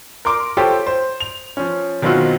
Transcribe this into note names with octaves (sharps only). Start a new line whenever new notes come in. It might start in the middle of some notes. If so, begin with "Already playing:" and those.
A#4 C6 D6
F4 G4 A4 C5 C#5 G5
C5
F7
F3 C#4
B2 D#3 F#3 C4 F4 F#4